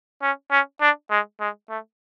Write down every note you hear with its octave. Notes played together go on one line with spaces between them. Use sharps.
C#4
C#4
D4
G#3
G#3
A3